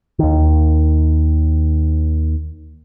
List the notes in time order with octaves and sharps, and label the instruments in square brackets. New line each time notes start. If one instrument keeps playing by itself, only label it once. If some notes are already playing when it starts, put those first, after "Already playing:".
[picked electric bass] D#2 D#3